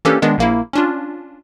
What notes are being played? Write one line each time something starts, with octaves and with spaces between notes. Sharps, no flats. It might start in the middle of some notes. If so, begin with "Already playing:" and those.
E3 A#3 C#4 D4 G4 A4
D#3 G#3 B3 D4
A#1 A#3 E4
C#4 D4 F4